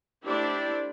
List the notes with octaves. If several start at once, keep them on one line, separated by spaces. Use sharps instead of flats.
A3 D4 E4 G4 C5 D5